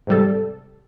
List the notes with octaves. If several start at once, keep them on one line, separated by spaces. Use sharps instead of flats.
G#2 C3 G3 A4